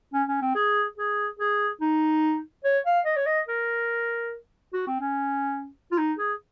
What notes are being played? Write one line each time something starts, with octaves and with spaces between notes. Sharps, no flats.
C#4
C#4
C4
G#4
G#4
G#4
D#4
C#5
F5
D#5
C#5
D#5
A#4
F#4
C4
C#4
F4
D#4
G#4